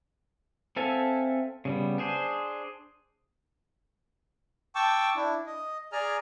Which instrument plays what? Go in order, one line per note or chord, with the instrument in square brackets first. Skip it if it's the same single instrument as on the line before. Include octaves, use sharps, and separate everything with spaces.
[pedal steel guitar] C4 A4 E5 F5 G#5
C#3 G3 B3
D4 G#4 C5
[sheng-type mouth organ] G5 A5 C#6 D6 E6
D4 E4
D#5
G#4 D5 G#5 A#5 F6